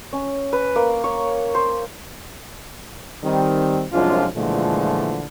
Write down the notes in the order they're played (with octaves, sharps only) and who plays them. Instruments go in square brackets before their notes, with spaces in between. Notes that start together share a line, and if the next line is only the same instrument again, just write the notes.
[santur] C#4
B4
A#3
C#5
C5
[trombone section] D#3 G3 C4
C2 F#2 F3 G#3 D4 F4
A#2 D3 E3 F3 G#3 A3